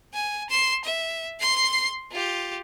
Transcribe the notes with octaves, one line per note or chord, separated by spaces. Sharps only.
G#5
C6 E7
E5
C6 C7
F4 G4